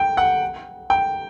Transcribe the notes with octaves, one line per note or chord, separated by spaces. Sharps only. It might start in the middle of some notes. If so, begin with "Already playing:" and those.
Already playing: G5
F#5
G5